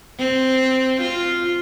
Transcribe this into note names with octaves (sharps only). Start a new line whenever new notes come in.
C4
F4